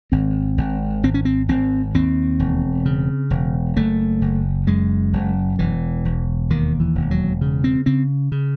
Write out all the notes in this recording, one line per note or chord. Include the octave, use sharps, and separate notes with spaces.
G#1 C4
G#1
G#1 C4
C#4
C4
G#1 C4
D#2 C4
E1
C#3
E1
F#1 A3
F#1
F#2 G#3
F#1
E1 E3
E1
D#2 D#3
E3
E1
F#3
C#3
C4
C#3 C4
C#3